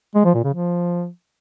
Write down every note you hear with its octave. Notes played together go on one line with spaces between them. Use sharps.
G#3
F3
A#2
C#3
F3